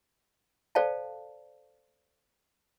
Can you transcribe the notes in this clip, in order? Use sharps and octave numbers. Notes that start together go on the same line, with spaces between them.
A4 C5 D5 F5 G5 A5